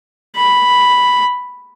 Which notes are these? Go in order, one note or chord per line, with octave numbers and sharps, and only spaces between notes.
B5